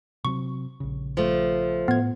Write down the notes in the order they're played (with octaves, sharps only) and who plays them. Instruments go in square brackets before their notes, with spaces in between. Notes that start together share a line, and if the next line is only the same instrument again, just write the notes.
[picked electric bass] C3 F#3 C4 [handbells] C#6
[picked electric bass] A#1 C#3
[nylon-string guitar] F3 A3
[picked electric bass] A2 [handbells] B3 G#6